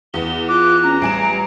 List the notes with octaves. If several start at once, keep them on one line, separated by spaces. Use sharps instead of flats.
E2 B3 G7
F4 D6 F#6
C#4 A#5
A1 G3 G#5 D7 E7